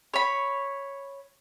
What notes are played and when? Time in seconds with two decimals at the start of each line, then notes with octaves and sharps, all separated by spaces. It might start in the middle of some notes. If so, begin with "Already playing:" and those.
0.14 C#5 B5